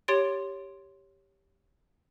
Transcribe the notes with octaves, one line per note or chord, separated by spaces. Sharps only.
G4 C#5 C6 A6 D7